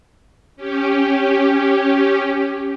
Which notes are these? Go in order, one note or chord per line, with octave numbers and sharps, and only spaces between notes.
C#4 G4